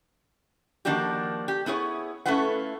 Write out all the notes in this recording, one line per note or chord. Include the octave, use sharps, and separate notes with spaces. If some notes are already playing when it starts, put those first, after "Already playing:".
D#3 F3 A#3 D4 F#4 G4
G4
B3 E4 G#4 C#5
A3 C#4 E4 F4 B4 F#5